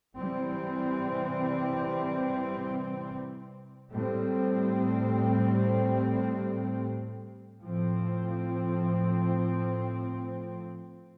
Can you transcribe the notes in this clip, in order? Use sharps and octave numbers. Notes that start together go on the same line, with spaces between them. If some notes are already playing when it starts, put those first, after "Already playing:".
C3 E3 G3 C4
A2 G3 C4
A2 F3 C4